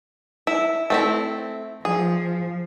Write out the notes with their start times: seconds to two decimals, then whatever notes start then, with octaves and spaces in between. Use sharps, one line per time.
0.47 E4
0.90 A3 C4 E4
1.85 F3 G#4